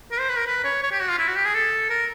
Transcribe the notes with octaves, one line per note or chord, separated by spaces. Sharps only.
A#4
C5
B4
A#4
B4
C#5
C#5
G4
F#4
F4
E4
F#4
G4
G#4
A4
A#4